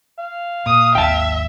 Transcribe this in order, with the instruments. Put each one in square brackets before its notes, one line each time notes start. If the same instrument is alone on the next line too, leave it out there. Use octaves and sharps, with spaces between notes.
[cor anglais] F5
[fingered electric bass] A#2 [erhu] D#6
[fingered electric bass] G#1 D#2 [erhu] E5 [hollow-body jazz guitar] G5 A5